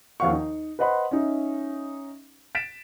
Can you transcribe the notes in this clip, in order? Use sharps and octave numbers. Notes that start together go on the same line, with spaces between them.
D#2 D#3 F3 F5 F#5 C#6
D#4
B4 C5 D#5 F#5 B5 C6
C#4 D#4 E5
A6 B6 D7 E7